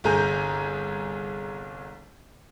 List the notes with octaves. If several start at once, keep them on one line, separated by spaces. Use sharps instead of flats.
G1 C2 G#4 A#5 G6